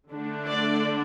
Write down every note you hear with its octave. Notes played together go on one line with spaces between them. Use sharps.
D3 A3 D4
D5